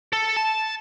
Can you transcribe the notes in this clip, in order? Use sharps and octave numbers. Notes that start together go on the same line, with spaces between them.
A4
A5